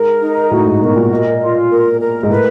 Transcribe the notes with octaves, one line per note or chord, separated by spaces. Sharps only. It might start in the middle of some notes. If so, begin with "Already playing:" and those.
Already playing: G#2 A#4
D#4
A2 F#4
G#2
B2 A#4
A#2
D#5
F4
A#4
A#4
G#2
A2 B4